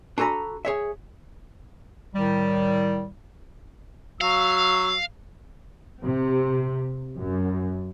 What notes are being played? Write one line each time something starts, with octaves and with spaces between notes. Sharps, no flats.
D4 F#4 A4 G#5 A#5 B5
G#4 C#5 E5
A2 D#3 G3
F#3 F5 E6
C3
F#2